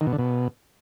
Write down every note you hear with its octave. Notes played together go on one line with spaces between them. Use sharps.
D#3
B2
D3
B2